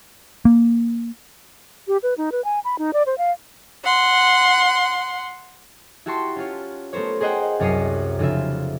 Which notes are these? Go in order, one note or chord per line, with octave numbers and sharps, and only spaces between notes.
A#3
G4
B4
D#4
B4
G#5
B5
D#4
D5
C5
F5
F#5 C6
E4 F#4 G4 A5 C6 C#6
C#4 F4 C#5
A3 B3 A#4 C5 C#5
G#4 A#4 C5 D#5 F#5 G5
C2 F#2 C#5 A#5 D#6 C7
F1 C#3 F4 E5